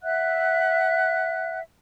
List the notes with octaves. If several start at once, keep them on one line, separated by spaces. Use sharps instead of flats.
E5 F#5 F#6